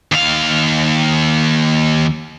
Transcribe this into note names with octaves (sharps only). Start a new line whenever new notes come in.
D#2 F5